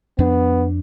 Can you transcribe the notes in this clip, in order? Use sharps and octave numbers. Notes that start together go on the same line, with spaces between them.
F2 B3 D4